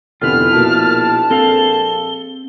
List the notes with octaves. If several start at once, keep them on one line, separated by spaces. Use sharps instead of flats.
F1 D3 B3 E4 F4 F6
A#1 B2 A#3 A5
C4 A4 F5 G7